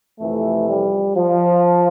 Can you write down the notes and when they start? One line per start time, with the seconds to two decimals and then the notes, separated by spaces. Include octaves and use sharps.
0.20 F2 C3 E3 A3
0.67 G3
1.15 F3